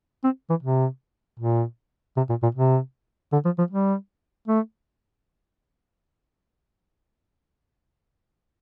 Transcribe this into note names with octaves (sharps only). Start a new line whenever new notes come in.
C4
E3
C3
A#2
C3
A#2
A#2
C3
D3
F3
F3
G3
A3